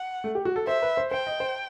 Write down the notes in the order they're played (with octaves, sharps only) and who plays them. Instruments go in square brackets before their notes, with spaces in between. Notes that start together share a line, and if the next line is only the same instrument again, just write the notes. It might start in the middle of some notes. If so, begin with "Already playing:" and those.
Already playing: [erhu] F#5
[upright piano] A3
G4
F#4
A4
[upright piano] C5 [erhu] E5
[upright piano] B4
C5
[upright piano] C5 [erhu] G5
[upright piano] D#5
C5